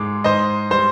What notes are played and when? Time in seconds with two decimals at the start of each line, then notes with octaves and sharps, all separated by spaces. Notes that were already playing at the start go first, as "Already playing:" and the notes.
Already playing: G#2 G#3 D6
0.24 G#2 C5 D#5
0.71 G3 C5